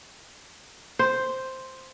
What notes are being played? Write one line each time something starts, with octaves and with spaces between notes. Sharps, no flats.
C5